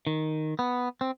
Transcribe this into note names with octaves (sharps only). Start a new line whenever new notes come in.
D#3
B3
C4